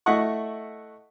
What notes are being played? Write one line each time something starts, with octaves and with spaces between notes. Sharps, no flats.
A3 E4 D#5 F#5 C#6